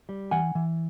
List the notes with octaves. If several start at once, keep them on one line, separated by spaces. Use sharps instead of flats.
G3
E3 F#5 G#5
E3